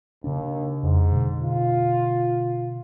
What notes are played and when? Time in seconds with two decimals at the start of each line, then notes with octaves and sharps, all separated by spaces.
0.24 D#2 C#3 D4
0.83 F2 G#2
1.12 B2 D3
1.44 F4